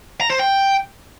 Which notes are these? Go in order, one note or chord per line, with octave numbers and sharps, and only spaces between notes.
A#5
C5
G5